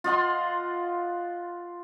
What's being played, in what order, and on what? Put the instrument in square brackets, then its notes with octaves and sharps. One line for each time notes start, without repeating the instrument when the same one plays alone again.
[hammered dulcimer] F4 D#5 F#5 C6